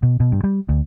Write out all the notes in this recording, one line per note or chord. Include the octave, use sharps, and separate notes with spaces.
B2
B2
G2
G3
D2